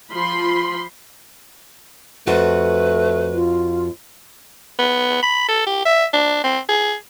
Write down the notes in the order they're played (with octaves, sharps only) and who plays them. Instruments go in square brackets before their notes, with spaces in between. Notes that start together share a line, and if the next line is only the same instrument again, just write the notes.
[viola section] F3 B5 C6
[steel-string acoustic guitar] F2 F#4 [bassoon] A3 [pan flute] B4
[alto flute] F4
[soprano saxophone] B3
B5
A4
G4
E5
D4
C4
G#4